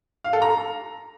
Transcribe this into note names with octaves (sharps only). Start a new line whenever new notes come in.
F5
A4
A#5